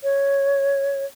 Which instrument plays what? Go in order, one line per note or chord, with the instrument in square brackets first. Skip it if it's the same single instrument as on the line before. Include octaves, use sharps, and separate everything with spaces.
[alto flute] C#5